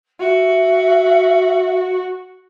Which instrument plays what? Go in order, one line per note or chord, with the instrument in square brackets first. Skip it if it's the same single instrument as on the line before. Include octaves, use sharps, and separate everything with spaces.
[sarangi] F#4 [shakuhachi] E5